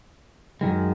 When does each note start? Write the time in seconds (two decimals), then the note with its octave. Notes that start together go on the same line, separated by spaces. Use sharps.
0.61 F#2 D#3 G#3